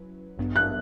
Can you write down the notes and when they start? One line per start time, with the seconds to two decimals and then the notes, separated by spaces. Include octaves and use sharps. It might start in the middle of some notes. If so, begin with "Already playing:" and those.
Already playing: F#3 C#4 E4 B4
0.38 A1 G2 F#3 B3 D4
0.56 F#6